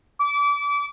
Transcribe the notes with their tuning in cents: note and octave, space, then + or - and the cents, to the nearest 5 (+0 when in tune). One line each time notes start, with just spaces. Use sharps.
D6 -30